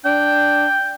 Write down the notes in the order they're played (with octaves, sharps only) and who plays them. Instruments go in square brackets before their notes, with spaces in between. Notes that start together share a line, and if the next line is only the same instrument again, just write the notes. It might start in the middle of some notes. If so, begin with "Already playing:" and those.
[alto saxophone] D4 [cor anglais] G5